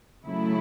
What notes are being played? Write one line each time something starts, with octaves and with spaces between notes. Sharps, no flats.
C#3 F#3 A3 E4